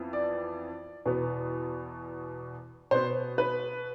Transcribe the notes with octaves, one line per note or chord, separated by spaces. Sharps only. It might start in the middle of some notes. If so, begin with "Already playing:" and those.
Already playing: F2 E3 B3
D5
E2 B2 B3
B2 B3 C5
B4